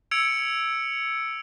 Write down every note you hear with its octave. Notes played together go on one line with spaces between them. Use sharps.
E6 G#6 C#7 D7 F7